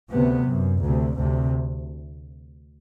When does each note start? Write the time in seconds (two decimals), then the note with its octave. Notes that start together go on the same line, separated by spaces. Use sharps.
0.11 D2 C3 B3
0.47 F#2
0.82 D2 C3
1.17 D2 C3